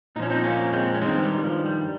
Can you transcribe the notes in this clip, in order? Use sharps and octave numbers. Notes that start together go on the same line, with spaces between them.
A#2 F3 C#4 D#4
C4 D#4
A#3 C#4
G#3 C4
C#4
G2 D#3 G#3 C4
G3
G3
F3
G3